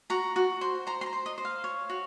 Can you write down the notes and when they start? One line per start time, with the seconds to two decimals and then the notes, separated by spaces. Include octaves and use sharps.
0.10 F#4 A#5
0.36 F#4
0.61 C5
0.87 C5 A#5
1.01 C6
1.06 A#5
1.13 C5
1.26 D#5
1.38 C5
1.45 F5
1.64 C#5
1.90 F#4